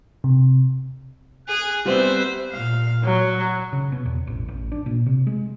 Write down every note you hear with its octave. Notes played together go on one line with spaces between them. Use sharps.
C3
G#4 F#6
G3 B3 C4 C5 E5
A#2 F5
F#3
C#3
B2
E2
A1
A1
D4
A#2
C3
G#3